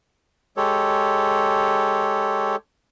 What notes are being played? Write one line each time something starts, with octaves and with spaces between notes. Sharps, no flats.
G#3 G4 A4 C#5